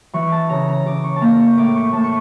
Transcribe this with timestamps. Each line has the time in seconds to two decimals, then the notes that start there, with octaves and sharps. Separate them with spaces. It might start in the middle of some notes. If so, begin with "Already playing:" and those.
0.13 E3 C#6
0.32 A5
0.49 C#3 A#5
0.68 A#5
0.86 C#3 D6
1.04 C#6
1.16 A5
1.21 A#3 A#5
1.39 C#6
1.57 A2 D6
1.75 C#6
1.93 A2 A5
2.04 C#6